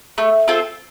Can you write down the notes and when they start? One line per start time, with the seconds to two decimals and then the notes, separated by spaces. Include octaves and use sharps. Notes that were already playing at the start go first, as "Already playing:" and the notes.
0.18 A3
0.48 C4 F4 A4